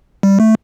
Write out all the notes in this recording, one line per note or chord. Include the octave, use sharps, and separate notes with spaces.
G3
A3